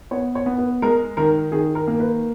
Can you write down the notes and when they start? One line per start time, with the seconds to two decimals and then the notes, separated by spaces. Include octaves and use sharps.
0.11 B3 C#5
0.35 C#5
0.46 B3
0.58 B4
0.82 G#3 A#4
1.17 D#3 A#4
1.52 D#3 G#4
1.75 A#4
1.88 A#3
2.00 B4